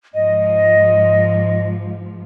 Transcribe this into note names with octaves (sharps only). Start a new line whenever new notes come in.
G#2 F3 D#5